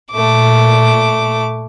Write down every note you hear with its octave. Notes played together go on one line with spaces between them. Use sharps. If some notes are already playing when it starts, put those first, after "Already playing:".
A#2 A3 D6